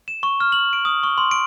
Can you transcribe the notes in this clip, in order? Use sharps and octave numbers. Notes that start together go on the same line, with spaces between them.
E7
C#6
F6
F#7
D7
D#6
C#6
C6
D7